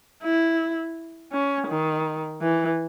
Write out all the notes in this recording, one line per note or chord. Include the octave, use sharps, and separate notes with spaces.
E4
C#4
D#3
E3